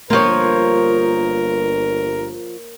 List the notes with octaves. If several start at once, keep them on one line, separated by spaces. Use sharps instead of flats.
G1 G2 F3 A#3 F4 A#4 C#5